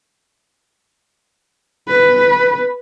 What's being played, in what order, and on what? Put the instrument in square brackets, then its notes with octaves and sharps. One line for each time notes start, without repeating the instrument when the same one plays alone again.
[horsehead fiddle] B4